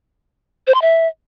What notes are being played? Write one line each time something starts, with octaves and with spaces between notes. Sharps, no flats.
C5
C6
E5